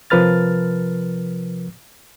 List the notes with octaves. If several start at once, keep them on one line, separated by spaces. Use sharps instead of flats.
C3 F3 A#4 B4 F6 A6